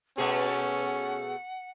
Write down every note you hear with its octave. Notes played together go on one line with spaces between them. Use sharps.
B2 A3 C#4 G#4 F#5